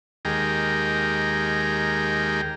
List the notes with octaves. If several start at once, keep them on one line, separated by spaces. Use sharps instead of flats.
D#2 G#3 G4 A#4